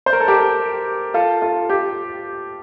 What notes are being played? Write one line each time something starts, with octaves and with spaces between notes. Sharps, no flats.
C5
A#4
A4
G4 A#4
F4 A4
F4 A4
G4